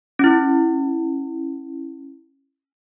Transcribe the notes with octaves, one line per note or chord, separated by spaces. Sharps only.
C#4 E4